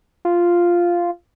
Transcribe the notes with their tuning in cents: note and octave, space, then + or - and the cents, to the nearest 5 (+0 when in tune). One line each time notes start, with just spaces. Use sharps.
F4 -5